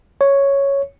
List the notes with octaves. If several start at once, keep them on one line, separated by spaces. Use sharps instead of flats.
C#5